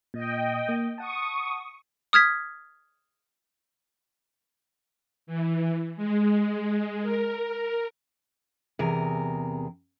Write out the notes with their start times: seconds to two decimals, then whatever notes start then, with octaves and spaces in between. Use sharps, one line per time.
0.14 A#2 D#5 G5
0.68 A#3
0.98 F#5 A5 C#6 D#6
2.13 D#6 F6 G#6 B6
5.27 E3
5.97 G#3
7.03 A#4
8.79 E2 C3 G#4 A#4